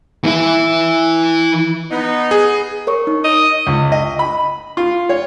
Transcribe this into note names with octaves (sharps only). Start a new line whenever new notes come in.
E3 E4
B3 D#4
G#4
A#4 C#5 C#6
D#4
D#5
C#2
D#5
B5
F4
C#5